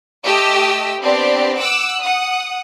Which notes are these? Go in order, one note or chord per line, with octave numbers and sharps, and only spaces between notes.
A3 G4 D#5 E6
B3 C4 D4 G4 D5
F#5 D6 E6 F#6
F#5 D#6